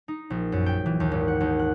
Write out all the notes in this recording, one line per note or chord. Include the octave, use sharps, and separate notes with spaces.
D#4
A#1
F#2
G5
E3
D#2
G#1
F#5
D#2
F#6